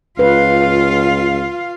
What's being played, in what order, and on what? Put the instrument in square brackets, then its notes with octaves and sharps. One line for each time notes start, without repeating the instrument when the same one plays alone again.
[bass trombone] C#2 [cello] F4 F5 [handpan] B4